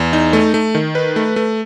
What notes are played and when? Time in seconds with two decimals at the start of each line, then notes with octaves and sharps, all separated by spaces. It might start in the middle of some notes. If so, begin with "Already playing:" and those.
Already playing: E2
0.13 D#4
0.33 A3
0.54 A3
0.75 D#3
0.95 B4
1.16 A3
1.36 A3